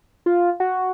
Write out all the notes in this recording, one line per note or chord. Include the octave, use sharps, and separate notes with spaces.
F4
F#4